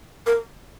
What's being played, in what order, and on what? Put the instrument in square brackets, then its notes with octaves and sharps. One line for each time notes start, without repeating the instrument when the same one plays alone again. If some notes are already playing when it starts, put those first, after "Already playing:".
[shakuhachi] A#4